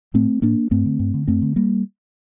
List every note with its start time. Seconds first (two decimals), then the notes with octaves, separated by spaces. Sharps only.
0.14 A2 A3 C4
0.42 A2 A#3 D4
0.71 G2 A3 C4
0.86 D3
0.99 G2
1.14 D3
1.28 F#2 A3 C4
1.42 D3
1.56 G3 A#3